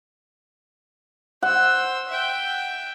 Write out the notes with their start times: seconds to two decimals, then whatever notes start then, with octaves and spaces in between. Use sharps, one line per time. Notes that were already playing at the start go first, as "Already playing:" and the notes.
1.43 C5 F#5 E6
2.09 E5 G5